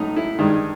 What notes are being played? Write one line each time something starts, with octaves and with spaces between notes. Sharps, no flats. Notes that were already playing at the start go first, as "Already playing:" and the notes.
Already playing: A2 F#3 A3 D#4
E4
G2 D#3 G#3 D#4